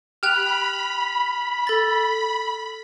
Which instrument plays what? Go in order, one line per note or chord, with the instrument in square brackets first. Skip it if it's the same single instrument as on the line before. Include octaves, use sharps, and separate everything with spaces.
[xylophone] G4 G5 F#6 [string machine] B5 [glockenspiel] F6 F7
[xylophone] A4 A6